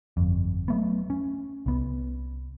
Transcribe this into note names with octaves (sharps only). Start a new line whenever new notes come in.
G1 F2
F#3 A3 B3
C#4
C2 B3